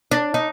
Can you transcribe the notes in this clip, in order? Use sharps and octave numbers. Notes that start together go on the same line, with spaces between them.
D4
D#4